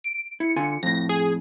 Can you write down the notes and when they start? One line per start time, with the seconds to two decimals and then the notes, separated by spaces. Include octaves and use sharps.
0.04 D7
0.40 E4 C#7
0.56 D3 F4 G#5
0.83 F2 A2 A#6
1.09 G#4